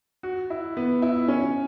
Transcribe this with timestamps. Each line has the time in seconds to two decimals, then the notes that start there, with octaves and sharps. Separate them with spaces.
0.23 F#4
0.50 E4
0.77 B3
1.02 E4
1.28 C#4